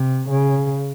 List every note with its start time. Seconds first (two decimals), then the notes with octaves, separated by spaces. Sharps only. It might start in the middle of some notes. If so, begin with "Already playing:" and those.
Already playing: C3
0.30 C#3